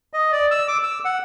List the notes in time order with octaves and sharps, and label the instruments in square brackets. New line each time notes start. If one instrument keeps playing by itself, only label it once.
[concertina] D#5
D5
E6
D6
E6
F#5